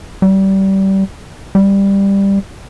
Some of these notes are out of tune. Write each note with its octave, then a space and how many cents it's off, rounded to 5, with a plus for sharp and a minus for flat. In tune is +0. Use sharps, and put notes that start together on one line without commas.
G3 -25
G3 +10